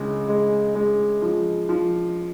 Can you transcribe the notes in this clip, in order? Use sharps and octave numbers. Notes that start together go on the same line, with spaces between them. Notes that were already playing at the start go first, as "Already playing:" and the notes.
Already playing: C#2 G#3
G#3
G#3
F3
F3